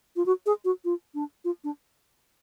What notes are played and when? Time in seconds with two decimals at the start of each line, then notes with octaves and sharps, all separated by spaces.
0.16 F4
0.26 F#4
0.46 G#4
0.65 F#4
0.85 F4
1.14 D4
1.45 F4
1.64 D4